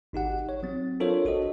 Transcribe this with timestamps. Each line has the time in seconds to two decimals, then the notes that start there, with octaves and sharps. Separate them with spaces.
0.13 G#1 D#4 G4 F#5
0.49 C#5
0.63 F#3 C4
1.00 D4 F4 A4 A#4 C5 C#5
1.25 A#1 F#4 A4 D#5